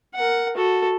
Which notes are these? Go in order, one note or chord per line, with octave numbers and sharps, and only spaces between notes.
A#4 F#5
F#4 A4